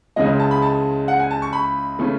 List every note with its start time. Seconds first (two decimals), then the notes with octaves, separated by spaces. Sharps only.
0.16 C#2 C#3 E3 G#3 D#5
0.40 A5
0.51 B5
0.62 A5
1.08 F#5
1.19 G#5
1.31 A5
1.42 C#6
1.53 B5
1.99 C#3 E3 A3